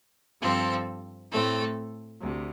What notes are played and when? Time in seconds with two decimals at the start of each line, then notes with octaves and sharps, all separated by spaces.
0.41 G2 F3 C4 A4
1.31 A2 A3 C4 A4
2.21 D2 C3